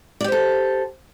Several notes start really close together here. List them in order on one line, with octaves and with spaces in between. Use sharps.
D5 G4 C5 A4